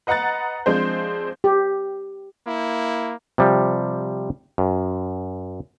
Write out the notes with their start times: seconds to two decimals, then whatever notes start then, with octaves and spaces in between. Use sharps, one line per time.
0.07 B4 D#5 F#5 A#5 F#6 A6
0.66 F3 G#3 C4 D4 C5
1.44 G4
2.47 A#3 E4
3.38 C3 F3 G3
4.58 F#2